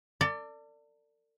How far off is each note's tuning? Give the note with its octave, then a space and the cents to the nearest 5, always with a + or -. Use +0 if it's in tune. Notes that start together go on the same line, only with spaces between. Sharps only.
A4 +40 D5 +0